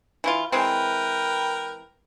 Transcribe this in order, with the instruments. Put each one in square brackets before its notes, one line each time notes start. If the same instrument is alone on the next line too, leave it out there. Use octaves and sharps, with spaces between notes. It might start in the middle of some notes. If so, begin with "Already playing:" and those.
[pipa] E3 E4 F4
[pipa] E3 G#3 C4 [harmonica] A#4 B4 G5